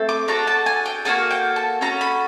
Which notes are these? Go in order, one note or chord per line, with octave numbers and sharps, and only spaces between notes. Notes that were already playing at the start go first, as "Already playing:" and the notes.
Already playing: A3 C4 A4
D6
D4 F#4 A4 A#5
A5
G#5
G5
A#3 D4 F#4 A4 G#5
G5
A5
C#4 F#4 A4 A#5
B5